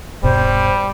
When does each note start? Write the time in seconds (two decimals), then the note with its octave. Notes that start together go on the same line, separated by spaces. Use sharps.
0.23 D#1 G2 B2 G3 C5